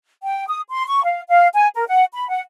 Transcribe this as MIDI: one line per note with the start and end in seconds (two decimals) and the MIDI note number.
0.23 0.46 79
0.47 0.61 87
0.69 0.85 84
0.86 1.02 85
1.03 1.21 77
1.28 1.47 77
1.54 1.67 80
1.74 1.84 70
1.87 2.03 78
2.13 2.28 83
2.29 2.41 78